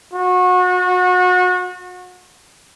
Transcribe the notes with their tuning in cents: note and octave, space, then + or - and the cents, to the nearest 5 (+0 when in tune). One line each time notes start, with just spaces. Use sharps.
F#4 -30